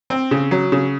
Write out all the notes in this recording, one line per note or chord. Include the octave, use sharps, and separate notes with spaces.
C4
C#3
F#3
C#3